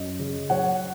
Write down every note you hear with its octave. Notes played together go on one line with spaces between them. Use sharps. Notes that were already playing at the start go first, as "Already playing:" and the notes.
Already playing: F#2 D#5
C#3
F#3 C#5 F#5